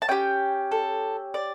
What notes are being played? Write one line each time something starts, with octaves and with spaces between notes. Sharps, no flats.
A5
C#4 G4 G5
A4
D5